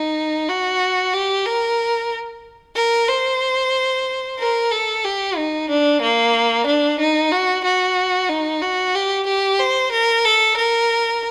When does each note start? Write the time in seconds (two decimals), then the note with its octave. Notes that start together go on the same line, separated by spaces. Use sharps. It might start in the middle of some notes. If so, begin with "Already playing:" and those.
Already playing: D#4
0.49 F#4
1.14 G4
1.46 A#4
2.76 A#4
3.09 C5
4.39 A#4
4.71 A4
5.04 G4
5.36 D#4
5.69 D4
6.01 A#3
6.66 D4
6.99 D#4
7.32 F#4
7.64 F#4
8.29 D#4
8.62 F#4
8.95 G4
9.27 G4
9.59 C5
9.92 A#4
10.25 A4
10.57 A#4